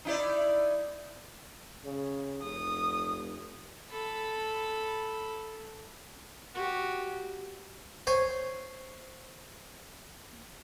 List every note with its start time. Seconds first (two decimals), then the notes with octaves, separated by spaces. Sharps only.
0.05 D#4 E4 D5
1.84 C#3
2.42 F1 D#6
3.91 A4 B5
6.54 F#4 G4
8.07 C5 C#5 G#5